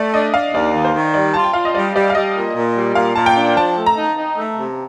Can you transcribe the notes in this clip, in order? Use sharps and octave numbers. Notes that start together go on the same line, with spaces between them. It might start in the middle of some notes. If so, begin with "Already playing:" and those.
Already playing: A3 D5
D4 D#5
D4 F5
D#2 D5
D#3
C5
D#3
G3 D5
F4 A5
G5
F4 F5
D#5
G3 D5
G3 D5
F5
G3 D#5
A#2
A#2
G3
A#2 F5
A#2 A5
G5
D4
F3 A5
A3
A#5
D#4
D#4
A3
C3